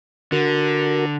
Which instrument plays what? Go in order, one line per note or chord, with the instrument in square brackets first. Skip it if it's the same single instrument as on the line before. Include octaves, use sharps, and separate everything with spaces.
[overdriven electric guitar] D3 [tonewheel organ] F#4 A#4